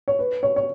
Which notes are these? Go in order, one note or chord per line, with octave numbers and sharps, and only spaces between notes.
C#5
B4
C#5
C#5